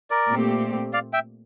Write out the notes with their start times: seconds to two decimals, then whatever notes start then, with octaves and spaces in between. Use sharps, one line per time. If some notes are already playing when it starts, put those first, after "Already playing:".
0.10 A#4 D5
0.31 A#2 A3 C4 G4
0.93 D5 F5
1.13 E5 G5